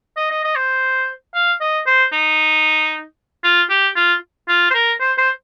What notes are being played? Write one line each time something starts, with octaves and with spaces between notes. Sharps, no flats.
D#5
D#5
D#5
C5
F5
D#5
C5
D#4
F4
G4
F4
F4
C5
A#4
C5
C5